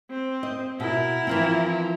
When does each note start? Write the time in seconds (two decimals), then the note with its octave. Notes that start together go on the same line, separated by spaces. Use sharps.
0.10 C4
0.43 D#5
0.80 B2 E4 A#4
1.27 E3 F3 C4